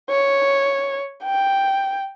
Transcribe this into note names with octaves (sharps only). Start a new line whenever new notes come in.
C#5
G5